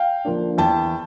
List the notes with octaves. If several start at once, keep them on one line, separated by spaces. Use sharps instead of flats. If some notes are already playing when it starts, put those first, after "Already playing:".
Already playing: F5 G5
D3 F3 A#3 D4
E2 G5 A5